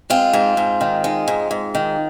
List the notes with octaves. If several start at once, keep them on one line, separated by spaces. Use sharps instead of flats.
G#3 C4 F4
G#2
G#2
D#3
G#3
G#2
G#2
D#3